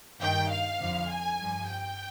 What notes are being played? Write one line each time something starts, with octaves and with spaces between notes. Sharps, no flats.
G2 D#3 G5
F5
F2 D3 F3
G#5
G2 F3
G5